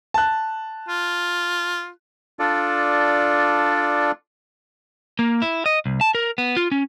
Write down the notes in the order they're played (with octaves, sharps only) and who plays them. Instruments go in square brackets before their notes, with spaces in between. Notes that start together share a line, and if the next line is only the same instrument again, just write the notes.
[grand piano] A5 F#6
[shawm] F4
[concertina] D4 F4 A4 D5
[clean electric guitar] A#3
E4
D#5
C2
A5
A#4
B3
F4
C#4